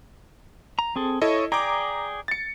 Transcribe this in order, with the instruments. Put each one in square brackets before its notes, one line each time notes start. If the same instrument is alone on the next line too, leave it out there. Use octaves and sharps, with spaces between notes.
[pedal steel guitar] A#5
C4 G#4 A4
[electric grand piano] E4 A4 D#5 [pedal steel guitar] C#5
[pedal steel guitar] G#4 D5 G5 [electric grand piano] A#5 D6
[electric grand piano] A6 C#7